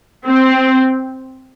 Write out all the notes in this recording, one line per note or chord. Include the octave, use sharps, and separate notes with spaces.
C4